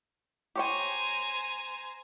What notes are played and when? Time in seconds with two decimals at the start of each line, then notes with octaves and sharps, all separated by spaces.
0.56 G4 C5 C#5 G5 G#5 A#5